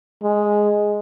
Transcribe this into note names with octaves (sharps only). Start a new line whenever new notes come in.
G#3